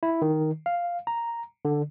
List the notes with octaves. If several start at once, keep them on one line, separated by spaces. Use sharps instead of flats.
E4
D#3
F5
A#5
D3